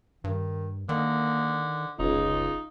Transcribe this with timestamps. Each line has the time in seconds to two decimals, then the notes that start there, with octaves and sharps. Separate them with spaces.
0.24 G2 D#3
0.89 D3 D#3 A#3
1.99 F1 C#2 D#4 F4